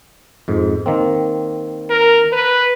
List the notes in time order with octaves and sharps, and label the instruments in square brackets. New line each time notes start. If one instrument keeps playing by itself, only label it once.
[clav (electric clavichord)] F2 G#2
D#3 A#3 C4
[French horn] A#4
B4